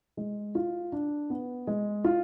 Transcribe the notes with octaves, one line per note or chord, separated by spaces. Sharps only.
G#3
F4
D4
B3
G#3
F4